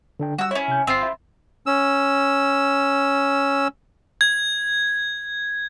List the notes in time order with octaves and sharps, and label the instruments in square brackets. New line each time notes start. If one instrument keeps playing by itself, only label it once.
[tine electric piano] D3 D4 G5
[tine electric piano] G3 [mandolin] F#4 E6
[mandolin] C#4 E4 [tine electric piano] C#5
[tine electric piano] C3 G6
[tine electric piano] G1 F5 C7 [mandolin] C4 F4
[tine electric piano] E5 B5 C6
[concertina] C#4 E6
[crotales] G#6